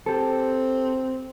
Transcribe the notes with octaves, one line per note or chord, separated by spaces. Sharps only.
C4 G4 A4